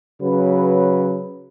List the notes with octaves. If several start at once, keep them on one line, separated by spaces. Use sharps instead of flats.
C#3 F#3 B4